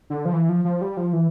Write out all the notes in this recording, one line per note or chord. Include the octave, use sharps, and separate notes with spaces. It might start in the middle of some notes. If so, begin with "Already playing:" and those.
D3
F3
E3
F3
F3
G3
F3
E3